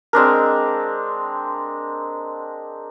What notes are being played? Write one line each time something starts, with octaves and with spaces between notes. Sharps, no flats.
G#3 C4 D4 A#4